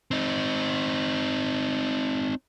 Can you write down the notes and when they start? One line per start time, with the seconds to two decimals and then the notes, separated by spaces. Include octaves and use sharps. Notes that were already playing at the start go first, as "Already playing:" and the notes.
0.11 C4 D#4